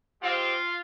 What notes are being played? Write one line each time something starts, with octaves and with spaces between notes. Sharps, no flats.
G#3 C4 F4 G4 F5